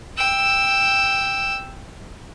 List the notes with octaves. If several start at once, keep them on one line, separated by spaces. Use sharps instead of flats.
G5 E6